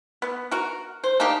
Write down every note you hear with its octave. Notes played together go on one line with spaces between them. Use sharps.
B3
F#4 A#4
C5
A#3 D4 D#4 G4